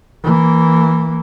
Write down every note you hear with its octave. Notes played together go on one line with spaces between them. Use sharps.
E3 A#3